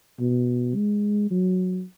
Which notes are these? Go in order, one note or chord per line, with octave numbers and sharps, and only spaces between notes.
B2
G#3
F#3